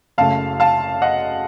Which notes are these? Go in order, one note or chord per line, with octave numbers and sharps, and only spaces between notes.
F#1 F#2 C#3 A3 F5 A5
F5 A5
D#5 F#5